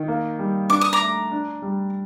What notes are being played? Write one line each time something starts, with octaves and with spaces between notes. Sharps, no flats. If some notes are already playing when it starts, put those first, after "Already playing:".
Already playing: D#3
A#3
G3
D4 D6
D#6
A#5 D6
A3
D4
G3